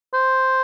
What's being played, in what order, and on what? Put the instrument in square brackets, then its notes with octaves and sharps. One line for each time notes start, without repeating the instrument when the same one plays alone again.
[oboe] C5